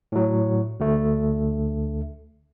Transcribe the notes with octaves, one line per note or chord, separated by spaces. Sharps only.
A2 F#3
D2 A3